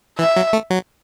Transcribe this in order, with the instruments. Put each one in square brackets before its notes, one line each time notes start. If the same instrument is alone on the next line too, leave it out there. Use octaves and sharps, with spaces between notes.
[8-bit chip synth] E3 [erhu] E5
[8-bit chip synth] F#3
A3
F#3